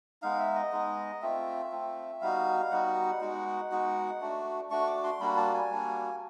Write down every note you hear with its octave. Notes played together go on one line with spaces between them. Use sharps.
G#3 B3 D#4 F5
E5
D#5
G#3 B3 D#4
A3 C4 F4 E5
A3 C4 F4
G3 B3 D#4 F#4 F5
G3 B3 D#4 F#4 F#5
G#3 B3 D#4 F#4
G#3 B3 D#4 F#4
A3 D4 F#4
A3 D4 F#4 C#6
D6
C6
G3 A#3 D4 F#4 B5
A5
G#5
G3 A#3 D4 F#4